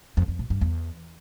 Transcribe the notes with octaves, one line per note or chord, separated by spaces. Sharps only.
F2
F2
A#2
G2
E2